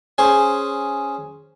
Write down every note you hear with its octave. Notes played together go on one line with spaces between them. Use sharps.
C#4 G#4 C5